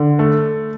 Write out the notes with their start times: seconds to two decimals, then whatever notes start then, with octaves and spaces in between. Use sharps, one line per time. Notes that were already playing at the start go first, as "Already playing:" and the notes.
Already playing: D3
0.19 A3